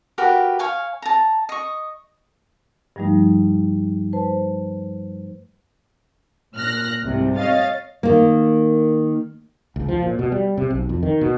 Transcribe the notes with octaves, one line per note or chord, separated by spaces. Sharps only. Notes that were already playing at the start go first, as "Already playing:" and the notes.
F#4 G4 A#4 B4
C#5 F5 G#5
A5 A#5
D#5 C#6
G2 F3 G3 A3 D#4
B4 C5 A5
A#2 F6 F#6 A#6
C2 G#2 C3
C#5 D#5 F5 A6
D#3 A#3
C#2
F3
A#2
B2
G3
C3
B1
F2
D#3
B2